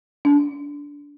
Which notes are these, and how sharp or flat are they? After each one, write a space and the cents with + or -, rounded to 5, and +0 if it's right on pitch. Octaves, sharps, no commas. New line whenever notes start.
D4 -20